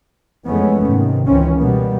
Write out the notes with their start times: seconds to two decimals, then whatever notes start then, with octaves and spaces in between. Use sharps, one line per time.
0.46 F2 E3 G#3 A3 B3 C#4
0.85 G#2 C3 D#3
1.26 C#2 D#3 E3 C4 C#4
1.58 B2 G3 A#3 B3